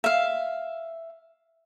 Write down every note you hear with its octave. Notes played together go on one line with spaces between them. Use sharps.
E5 F5